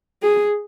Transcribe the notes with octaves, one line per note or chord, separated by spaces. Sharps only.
G#4